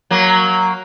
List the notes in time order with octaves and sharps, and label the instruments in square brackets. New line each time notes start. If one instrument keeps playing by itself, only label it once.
[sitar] F#3 A#3